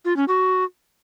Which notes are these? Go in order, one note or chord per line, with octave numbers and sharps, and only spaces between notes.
F4
C#4
F#4